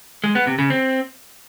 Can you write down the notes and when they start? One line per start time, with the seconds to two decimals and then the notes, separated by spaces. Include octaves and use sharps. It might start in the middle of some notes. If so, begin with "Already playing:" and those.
0.24 G#3
0.35 B3
0.47 C3
0.59 C#3
0.70 C4